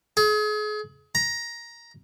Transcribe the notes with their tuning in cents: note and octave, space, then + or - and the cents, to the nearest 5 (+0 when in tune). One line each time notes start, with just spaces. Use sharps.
G#4 +35
A#5 +10